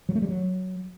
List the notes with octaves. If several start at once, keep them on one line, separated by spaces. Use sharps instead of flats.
F#3
A3
G3
F#3